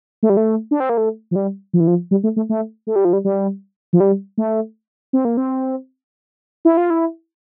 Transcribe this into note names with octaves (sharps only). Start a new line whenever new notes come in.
A3
G3
A3
D4
C4
A#3
A3
F3
G3
F3
E3
F3
G3
A3
A3
A3
A3
G3
F3
G3
G3
F3
G3
A3
C4
A#3
C4
E4
F4
E4